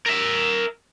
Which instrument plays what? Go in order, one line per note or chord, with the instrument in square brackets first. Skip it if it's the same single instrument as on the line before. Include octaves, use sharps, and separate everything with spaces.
[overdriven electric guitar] A#4 E5